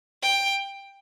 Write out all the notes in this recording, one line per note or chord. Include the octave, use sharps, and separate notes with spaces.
G5